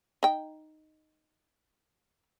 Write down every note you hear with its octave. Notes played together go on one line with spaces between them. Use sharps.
D#4 G5